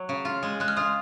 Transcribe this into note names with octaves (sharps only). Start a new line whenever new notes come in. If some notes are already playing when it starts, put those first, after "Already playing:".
Already playing: F#3
C#3
F4
G#3
G#3 F#6
F6
F4 D#6